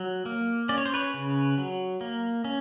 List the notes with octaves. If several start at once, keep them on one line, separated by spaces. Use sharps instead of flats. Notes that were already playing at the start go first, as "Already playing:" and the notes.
Already playing: F#3
A#3
C#4 D5
C#5
C5
B4 C#5
C#3
F#3
A#3
C#4